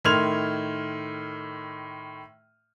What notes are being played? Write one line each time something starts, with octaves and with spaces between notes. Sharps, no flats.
A2 D#3 C6 F6 G#6 F7